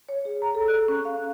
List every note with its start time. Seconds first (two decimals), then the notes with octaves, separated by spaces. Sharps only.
0.09 C#5
0.25 G#4
0.42 A#5
0.55 A4
0.68 F#6
0.88 C#4
1.05 F5